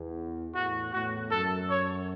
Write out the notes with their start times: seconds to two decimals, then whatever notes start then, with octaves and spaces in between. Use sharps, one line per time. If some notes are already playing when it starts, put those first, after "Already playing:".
Already playing: E2
0.54 E2 A2 F#4
0.93 E2 A2 F#4
1.31 F#2 A4
1.70 C#5